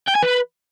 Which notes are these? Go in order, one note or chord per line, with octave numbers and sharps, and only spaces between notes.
G5
G#5
B4